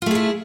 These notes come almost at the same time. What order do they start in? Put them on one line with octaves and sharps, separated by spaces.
F4 A3 G#4 E4